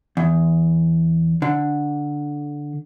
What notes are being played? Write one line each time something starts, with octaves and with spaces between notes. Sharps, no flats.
E2
D3